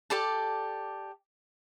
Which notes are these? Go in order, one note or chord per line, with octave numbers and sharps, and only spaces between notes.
G4 A4 D5 A5